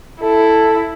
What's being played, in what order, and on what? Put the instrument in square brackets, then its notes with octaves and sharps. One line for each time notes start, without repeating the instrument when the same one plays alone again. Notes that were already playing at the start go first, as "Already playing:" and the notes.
[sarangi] E4 [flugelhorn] A4